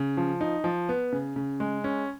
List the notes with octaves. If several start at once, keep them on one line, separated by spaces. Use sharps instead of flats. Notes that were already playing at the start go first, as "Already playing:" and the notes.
Already playing: C#3
F3
D#4
F3
B3
C#3
C#3
G#3
C#4